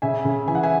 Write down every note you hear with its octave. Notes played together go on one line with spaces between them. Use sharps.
C#3 E5 G#5
C#3
E3 G#5
F#5
E5 G#5